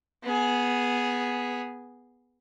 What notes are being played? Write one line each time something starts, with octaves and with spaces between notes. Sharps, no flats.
B3 G#4